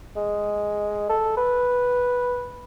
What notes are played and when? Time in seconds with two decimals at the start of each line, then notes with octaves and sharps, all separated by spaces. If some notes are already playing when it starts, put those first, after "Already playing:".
0.16 G#3
1.10 A4
1.37 B4